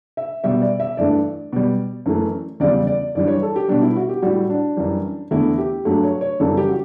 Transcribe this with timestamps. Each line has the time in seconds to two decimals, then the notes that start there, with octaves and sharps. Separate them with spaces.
0.17 E5
0.44 B2 G3 E5
0.62 D5
0.80 E5
0.97 G2 E3 A3 D5
1.53 B2 G3
2.06 F#2 E3 A3
2.60 E2 C#3 G3 D5
2.87 D5
3.15 G2 E3 G3 D5
3.28 C#5
3.42 A4
3.56 G4
3.69 B2 G3 D4
3.82 E4
3.96 F#4
4.09 G4
4.22 A2 G3 F#4
4.50 D4
4.77 F#2 E3 G3
5.31 E2 D3 A3 E4
5.58 G4
5.85 G2 F#3 A3
6.03 C#5
6.21 C#5
6.40 F#2 C#3 E3 G3 A4
6.57 G4
6.69 F#4